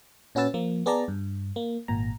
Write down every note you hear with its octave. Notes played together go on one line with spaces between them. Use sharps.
A#2 C#4 F#4 B4 E6 A6
F3 A#3
B3 G#4 D5 A5 A#5
G2
A#3
G#1 A#2 A#5